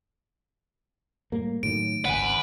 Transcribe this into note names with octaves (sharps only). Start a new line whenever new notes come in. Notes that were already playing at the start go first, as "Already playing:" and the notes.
A2 G3 A#3
A2 D#3 F#3 D7
G#1 C#2 B4 F#5 G#5